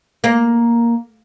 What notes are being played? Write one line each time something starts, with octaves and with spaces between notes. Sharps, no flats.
A#3